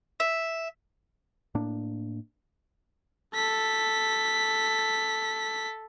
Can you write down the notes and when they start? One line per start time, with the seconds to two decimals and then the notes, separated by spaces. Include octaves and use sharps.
0.20 E5
1.55 A2 A#3 D4
3.35 A4 B6